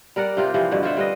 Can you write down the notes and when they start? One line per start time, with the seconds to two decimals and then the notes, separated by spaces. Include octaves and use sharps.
0.16 G3 A#4 D5 F#5
0.37 C3 F4 G4
0.54 C3 E3 F3
0.71 G2 B2 D3
0.83 F4 C5 E5 F#5
0.97 G3 B4 D#5